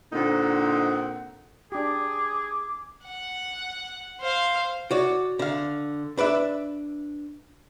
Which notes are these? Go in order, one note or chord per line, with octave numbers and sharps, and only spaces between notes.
A#2 D3 C4 D#4 C5 F#5
D4 G4 G#4 D6
F#5
C5 F5
F#4 C#5 D5
D3 F5
D4 B4 D5 E5